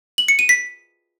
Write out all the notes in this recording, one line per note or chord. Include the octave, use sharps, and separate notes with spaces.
F#7
C#7
D#7
B6